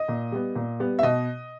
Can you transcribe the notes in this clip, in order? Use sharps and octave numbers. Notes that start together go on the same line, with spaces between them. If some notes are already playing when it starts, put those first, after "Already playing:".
Already playing: D#5
A#2
G3 B3
A#2
G3 B3
E5
B2 D#5